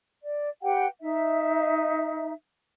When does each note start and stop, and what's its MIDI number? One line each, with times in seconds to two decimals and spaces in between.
0.23 0.49 74
0.62 0.86 67
0.62 0.86 71
0.62 0.86 78
0.62 0.86 79
1.01 2.33 63
1.01 2.33 76